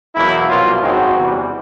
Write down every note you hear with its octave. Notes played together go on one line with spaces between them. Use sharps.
E2 B2 F#3 A#3 E4
C2 B2 F#3 A#3 F4
G#1 F#2 D#3 G#3 C4 F#4
E2 C3 E3 G3